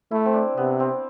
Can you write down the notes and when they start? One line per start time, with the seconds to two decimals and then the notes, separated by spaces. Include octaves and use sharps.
0.11 A3 E4
0.26 C4
0.34 D4
0.57 C3 B3
0.80 C4